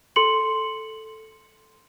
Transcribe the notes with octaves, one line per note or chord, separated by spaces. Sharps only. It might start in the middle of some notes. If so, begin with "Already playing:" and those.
A4 C6 C#7 F#7